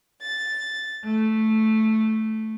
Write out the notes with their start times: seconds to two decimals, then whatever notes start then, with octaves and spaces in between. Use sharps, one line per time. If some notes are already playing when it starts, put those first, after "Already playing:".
0.22 A6
1.03 A3